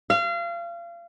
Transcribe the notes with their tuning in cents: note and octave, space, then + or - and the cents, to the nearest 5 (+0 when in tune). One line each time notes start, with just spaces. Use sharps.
F5 -30